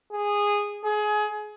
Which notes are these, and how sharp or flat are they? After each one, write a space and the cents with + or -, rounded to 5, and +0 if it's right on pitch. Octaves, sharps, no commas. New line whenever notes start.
G#4 -15
G#4 +25